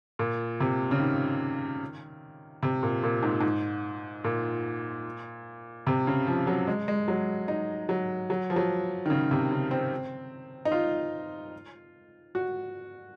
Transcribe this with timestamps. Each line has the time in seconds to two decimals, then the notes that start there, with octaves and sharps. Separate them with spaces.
0.19 A#2
0.60 C3
0.91 C#3
1.00 D#3
2.63 C3
2.83 A#2
3.03 A#2
3.23 G#2
3.40 G#2
4.24 A#2
5.87 C3
6.07 C#3
6.27 F3
6.47 F#3
6.67 G#3
6.88 G#3
7.08 F#3
7.48 D#4
7.89 F#3
8.30 F#3
8.50 F3
8.56 F#3
9.06 D#3
9.10 C#3
9.31 C3
9.51 C#3
9.71 C4
10.65 D#4
10.72 F4
12.35 F#4